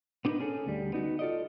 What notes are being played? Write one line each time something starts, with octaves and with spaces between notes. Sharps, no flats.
B3 D4 D#4 G#4 A#4 B4
C#4 G#4 A4
D2 G3
B3 D#4 F#4
F4 A4 D5 D#5